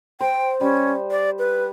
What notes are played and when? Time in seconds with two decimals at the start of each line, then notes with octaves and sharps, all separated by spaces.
0.21 C5 G5
0.61 G3 C#4
1.11 D5
1.39 B4